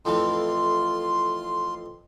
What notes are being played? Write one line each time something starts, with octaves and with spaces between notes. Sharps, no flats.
F2 A2 E3 F4 C6